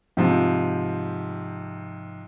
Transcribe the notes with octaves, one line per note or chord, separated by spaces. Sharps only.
G#2 C3 F3